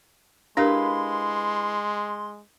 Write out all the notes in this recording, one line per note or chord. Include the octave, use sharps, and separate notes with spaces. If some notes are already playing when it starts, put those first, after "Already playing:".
G#3 D4 E4 G4 A#4 B4 F5 C6